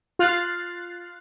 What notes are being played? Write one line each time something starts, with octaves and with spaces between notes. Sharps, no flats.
F4 F6 F#6 A6 C7